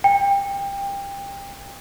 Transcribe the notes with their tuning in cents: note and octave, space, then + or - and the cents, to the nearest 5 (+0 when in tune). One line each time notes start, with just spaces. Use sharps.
G5 +25